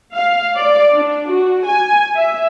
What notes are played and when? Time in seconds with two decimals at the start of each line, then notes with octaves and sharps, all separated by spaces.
0.14 F5
0.57 D5
0.95 D4
1.30 F#4
1.66 G#5
2.16 E5